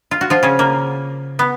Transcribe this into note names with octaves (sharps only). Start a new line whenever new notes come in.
F4
F#4
F3 F4
C#3 C#4
A#3
B3